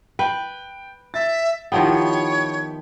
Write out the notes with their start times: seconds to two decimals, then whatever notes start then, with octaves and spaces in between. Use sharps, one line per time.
0.19 B4 G5
1.14 E5 A6
1.72 D#3 F3 B3 E4 G4 C#5 G5